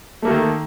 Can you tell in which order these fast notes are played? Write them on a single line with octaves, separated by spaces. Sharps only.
A3 A#3 A4 D#3